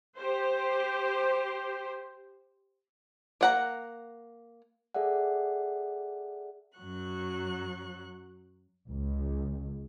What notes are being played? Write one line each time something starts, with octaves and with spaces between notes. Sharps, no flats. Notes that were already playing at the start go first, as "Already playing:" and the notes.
G4 C5
A#3 F#5 A#5
G#4 A4 D5 E5 F#5
F#2 F#3 C#6 F#6
C#2